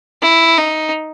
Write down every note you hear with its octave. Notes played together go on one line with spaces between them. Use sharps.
E4
D#4